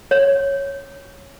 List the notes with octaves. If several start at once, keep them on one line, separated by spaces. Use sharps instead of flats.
C#5